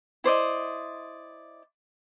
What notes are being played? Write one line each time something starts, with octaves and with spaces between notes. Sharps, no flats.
E4 C5 D5 D#5